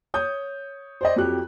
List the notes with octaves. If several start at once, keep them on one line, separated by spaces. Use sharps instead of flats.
C#5 D#6 G6
C5 D5 D#5
F2 F#3 G4 F#6